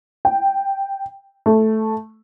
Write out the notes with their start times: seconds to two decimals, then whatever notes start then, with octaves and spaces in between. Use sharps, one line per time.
0.25 G5
1.46 A3